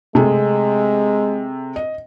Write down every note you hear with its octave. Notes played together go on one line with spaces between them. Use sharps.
C3 G#3 A3 G#4
D#5